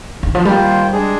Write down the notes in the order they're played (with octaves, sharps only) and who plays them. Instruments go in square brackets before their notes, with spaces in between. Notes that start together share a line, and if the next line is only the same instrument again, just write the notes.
[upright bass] D#3
F3
[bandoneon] D#3 A#3 F4 C5 [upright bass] G3
[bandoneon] G#3 D4 G#4